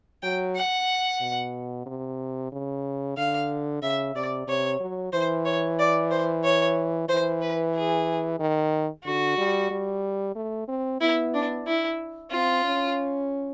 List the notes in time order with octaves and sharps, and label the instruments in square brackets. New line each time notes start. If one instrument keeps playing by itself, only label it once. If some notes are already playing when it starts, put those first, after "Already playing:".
[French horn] F#3 [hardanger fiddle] G5
[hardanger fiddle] F#5
[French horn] B2
C3
C#3
[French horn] D3 [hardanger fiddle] F5
[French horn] C#3 [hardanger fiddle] E5
[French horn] C3 [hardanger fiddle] D5
[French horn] C3 [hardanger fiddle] C#5
[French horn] F#3
[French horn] E3 [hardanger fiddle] C5
[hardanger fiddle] C#5
D5
C5
C#5
[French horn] E3 [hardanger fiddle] C5
[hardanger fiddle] B4
G#4
[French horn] D#3
[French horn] D3 [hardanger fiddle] F#4
[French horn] G3
G3
A3
C4
[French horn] B3 [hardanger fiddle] E4
[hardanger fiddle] D4
E4
[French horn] C4 [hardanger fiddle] F4
[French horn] C#4